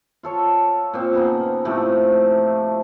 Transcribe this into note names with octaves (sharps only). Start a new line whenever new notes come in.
F4 A4 C#5
A#2 C4
C#3 B3 D#4
A2 C3 F3 A3